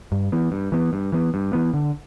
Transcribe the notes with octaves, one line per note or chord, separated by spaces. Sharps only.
G2
E3 B3
G2
E3 B3
G2
E3 B3
G2
E3 B3
D3